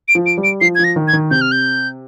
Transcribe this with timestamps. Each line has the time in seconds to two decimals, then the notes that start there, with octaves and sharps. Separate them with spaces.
0.08 D7
0.15 F3
0.26 D7
0.38 G3
0.44 D7
0.61 F3 C7
0.75 F3 G#6
0.84 A#6
0.96 D#3
1.08 G#6
1.13 D#3
1.31 C3 G6
1.41 F6
1.52 G6